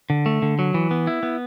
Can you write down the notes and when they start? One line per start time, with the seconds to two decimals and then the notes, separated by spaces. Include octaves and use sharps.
0.10 D3
0.26 A3
0.42 D3
0.59 F#3
0.74 E3
0.91 B3
1.07 E4
1.23 B3